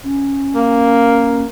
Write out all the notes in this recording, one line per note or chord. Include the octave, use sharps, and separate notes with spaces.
C#4
A#3